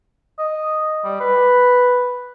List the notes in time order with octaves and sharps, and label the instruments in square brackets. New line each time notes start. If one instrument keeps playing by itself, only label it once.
[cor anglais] D#5
G3
B4